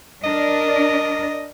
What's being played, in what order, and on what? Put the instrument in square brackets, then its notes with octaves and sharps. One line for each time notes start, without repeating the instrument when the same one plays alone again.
[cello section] D4 A#4 [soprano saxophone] D#5